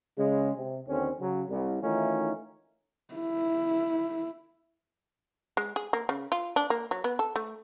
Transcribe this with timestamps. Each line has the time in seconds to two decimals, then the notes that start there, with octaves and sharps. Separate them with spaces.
0.18 C#3 G#3
0.56 C3
0.88 D#2 D3 C4 C#4
1.20 C#3 F#3
1.49 C2
1.82 D#3 E3 A3 C#4 D#4 F4
3.15 E4
5.57 G#3
5.76 G#4
5.93 A#3
6.09 C#3
6.32 F4
6.56 D4
6.70 A#3
6.91 F#3
7.04 B3
7.19 A4
7.36 A3